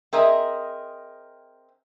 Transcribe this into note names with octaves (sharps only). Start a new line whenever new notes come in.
C4 G#4 A#4 D#5 E5